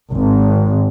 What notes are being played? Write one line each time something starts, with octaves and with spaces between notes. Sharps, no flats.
G#1